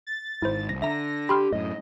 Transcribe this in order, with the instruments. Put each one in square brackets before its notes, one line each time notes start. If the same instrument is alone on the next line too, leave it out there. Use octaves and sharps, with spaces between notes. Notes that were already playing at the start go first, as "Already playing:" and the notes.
[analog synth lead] A6
[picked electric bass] G#1 G#2 [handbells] E4 C5
[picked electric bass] C2 [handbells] A#6
[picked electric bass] D3 [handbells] E5 A#5 [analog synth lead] A#6
[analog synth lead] G4 [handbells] B5 C6 F6
[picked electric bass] F#2 A2 [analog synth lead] D#5